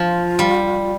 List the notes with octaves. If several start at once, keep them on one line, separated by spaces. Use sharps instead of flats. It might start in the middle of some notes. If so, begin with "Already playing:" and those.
Already playing: F3 F4
G3